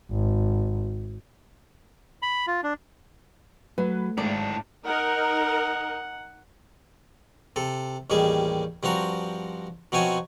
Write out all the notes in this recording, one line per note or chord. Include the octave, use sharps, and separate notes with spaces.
G#1
B5
F4
D4
F#3 A3 B4
G#1 A2 D4 D5
D#4 A#4 F#5
C3 A4
A1 D#2 D#3 G3 G#4
G2 F3 C4 F#4 A#5
B2 F3 F#3 C4 C#5 G#5